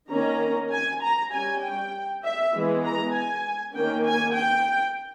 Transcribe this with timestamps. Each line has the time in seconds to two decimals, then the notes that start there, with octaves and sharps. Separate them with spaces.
0.11 D#3 A#3 C#4 A#5
0.72 G#5
1.02 A#5
1.32 G3 C#4 G#5
1.63 G5
2.24 E5
2.54 E3 G#3 B3
2.85 A#5
3.15 G#5
3.76 D#3 A#3 C#4 G5
4.06 G#5
4.37 G5